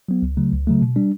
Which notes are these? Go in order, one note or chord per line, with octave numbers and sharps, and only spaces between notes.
F#3 B3
C#2
C#3 F#3 A3
C#2
C#3 F#3 A3
B2
G3 D4